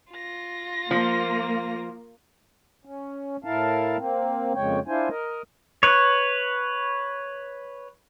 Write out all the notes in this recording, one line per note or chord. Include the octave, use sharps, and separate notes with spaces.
F4 A#6
F3 A#3
C#4
A2 E4 A#4 F5 A5
A#3 C4
F2 A#2 C#3 G#3 C#5 G5
D4 E4 F4 C5 G#5
A#4 D#5
B4 C#5